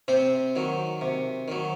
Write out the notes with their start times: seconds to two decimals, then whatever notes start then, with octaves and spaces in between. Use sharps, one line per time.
0.08 C3 C4 C5
0.56 D#3 F#3
1.01 C3
1.48 D#3 F#3